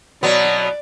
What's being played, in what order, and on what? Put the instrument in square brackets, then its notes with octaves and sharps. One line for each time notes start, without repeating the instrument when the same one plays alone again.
[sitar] B2 F#3 B3 [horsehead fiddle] D5